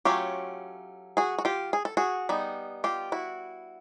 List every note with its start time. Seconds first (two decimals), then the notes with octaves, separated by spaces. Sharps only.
0.05 F#3 A3 C#4 F4 G4
1.17 F#4 G#4
1.38 F#4
1.45 F4 G4
1.73 G#4
1.85 A4
1.97 F#4 G#4
2.29 G3 B3 D#4
2.84 F4 G4
3.12 E4 F#4